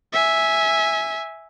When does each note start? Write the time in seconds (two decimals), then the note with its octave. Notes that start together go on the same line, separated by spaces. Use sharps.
0.13 E5 G#5